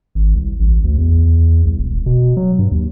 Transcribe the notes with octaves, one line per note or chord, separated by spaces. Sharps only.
G#1
C2
A1
D2
E2
C2
E1
D#1
B2
F#3
G2
D#2